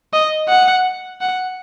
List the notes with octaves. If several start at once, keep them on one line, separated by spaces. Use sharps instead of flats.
D#5
F#5
F#5